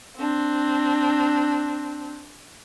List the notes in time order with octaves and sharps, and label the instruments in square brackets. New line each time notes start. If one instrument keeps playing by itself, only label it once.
[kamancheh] C4 D4